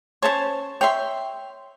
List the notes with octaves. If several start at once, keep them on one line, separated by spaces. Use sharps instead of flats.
C#4 C5 C#5 A5 C6
C#5 E5 G5 C6